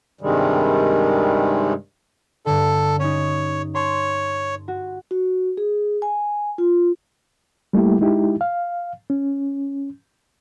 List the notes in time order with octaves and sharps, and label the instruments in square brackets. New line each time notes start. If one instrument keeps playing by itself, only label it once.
[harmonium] G2 C3 D#3 G3 G#3
[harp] G2 D3 [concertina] A4
[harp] C#4 D#4 [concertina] C#5
[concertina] C#5 [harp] A5 C6
[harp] F#4
[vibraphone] F#4
G#4
G#5
F4
[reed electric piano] G3 A3 A#3 E4 G4
G#3 D#4 E4 G4
F5
C#4